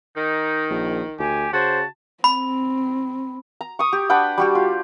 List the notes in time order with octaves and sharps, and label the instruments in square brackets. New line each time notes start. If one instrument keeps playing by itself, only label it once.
[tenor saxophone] D#3 [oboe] D#4
[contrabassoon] A#1
[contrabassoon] D2 [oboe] G4 [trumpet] G#5
[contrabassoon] C#3 [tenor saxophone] F#4 [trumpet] C5 [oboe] A5
[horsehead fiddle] C4 [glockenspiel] B5
[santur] A#5
C#6 D#6
G4
D4 B4 F#5 G5
G3 F#4 G4
F4